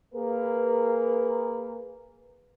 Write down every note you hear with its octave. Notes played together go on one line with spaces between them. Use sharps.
A#3 G#4 A#4 B4